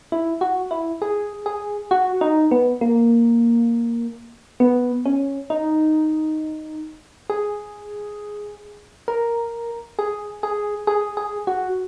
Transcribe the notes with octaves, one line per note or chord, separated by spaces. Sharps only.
E4
F#4
E4
G#4
G#4
F#4
D#4
B3
A#3
B3
C#4
D#4
G#4
A#4
G#4
G#4
G#4
G#4
F#4